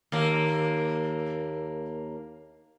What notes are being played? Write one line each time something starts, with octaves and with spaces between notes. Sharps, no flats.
D#2 A#3